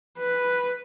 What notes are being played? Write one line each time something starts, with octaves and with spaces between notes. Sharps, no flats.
B4